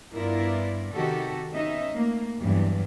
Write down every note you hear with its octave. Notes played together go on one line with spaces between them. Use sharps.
G2 B3 E4 F4 A#4 D5
C3 D#3 F#4 G4 A4
B3 C#4 D#4 D#5 E5
A3 A#3
E2 G2 E3 F#3